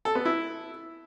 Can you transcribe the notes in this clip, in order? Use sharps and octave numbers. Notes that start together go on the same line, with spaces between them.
A4
B3
E4